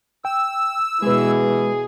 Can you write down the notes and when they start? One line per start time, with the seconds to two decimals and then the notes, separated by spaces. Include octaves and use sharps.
0.25 G5 E6
1.02 B2 E3 G#3 G#4 B4